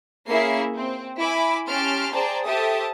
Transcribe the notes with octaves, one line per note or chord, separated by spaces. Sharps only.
A#3 C#4 E4 G#4 E5 C7
C4
E4 G#5 B5 D6
C#4 G4 A5 C6 F6 D7
G#4 C5 D5 G5 A5 A#5
G4 A4 C5 E5 A5 D#6